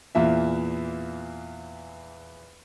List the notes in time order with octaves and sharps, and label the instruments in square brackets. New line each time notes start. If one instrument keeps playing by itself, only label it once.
[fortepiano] E2 A#2 E3 E5